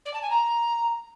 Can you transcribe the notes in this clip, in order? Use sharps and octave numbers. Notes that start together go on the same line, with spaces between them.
D5
A5
G#5
A#5